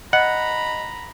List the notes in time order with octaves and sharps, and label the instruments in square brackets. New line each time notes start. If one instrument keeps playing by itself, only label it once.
[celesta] D#5 [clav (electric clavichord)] F#5 [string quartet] A#5 B5